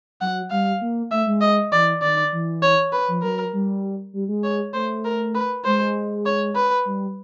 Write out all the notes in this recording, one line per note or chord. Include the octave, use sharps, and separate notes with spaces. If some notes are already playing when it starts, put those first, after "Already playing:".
F#3 F#5
G3 F5
A#3
A3 E5
G#3
D#5
E3 D5
D#3 D5
E3
C#5
B4
F3
F#3 A#4
G3
G3
G#3
C#5
A3 C5
A#4
B4
G#3 C5
C#5
B4
G3